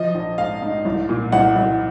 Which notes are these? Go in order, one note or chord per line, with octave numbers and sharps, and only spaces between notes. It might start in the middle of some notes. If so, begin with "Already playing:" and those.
Already playing: F3 D#5
A#1
G#2 F5
G#2
C2
A#2
C2 F#5
C2